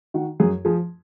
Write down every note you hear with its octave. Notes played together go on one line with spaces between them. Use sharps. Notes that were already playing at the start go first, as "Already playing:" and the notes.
D#3 F#4
F#2 G#4
F3 G#4